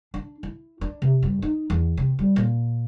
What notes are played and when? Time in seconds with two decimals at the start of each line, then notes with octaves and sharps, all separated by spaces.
0.14 D4
0.43 E4
0.81 D4
1.02 C3
1.22 G2
1.42 D#4
1.70 E2
1.97 C3
2.19 G3
2.36 A#2